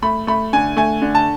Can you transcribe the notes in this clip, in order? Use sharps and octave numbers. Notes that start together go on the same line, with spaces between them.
A3 B5
A3 B5
D3 G#5
A3 G#5
D3
A5